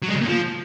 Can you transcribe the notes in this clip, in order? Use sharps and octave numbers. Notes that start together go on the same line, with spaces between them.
F#3
G#3
C#3
A#2
F3